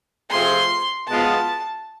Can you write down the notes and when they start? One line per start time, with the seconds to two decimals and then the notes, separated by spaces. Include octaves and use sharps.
0.30 C3 F3 A3 C4 G#4 C6
1.08 B2 G#3 B3 F4 A5